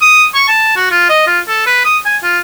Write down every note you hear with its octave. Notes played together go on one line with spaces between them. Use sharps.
D#6
C#6
A5
F#4
F4
D#5
F4
A4
B4
D#6
G#5
F4